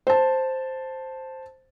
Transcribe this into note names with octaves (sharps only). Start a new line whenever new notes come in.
C5 A5